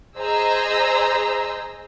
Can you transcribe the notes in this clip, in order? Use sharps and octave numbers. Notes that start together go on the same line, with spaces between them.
G#4 C5 D#5 A#5 E6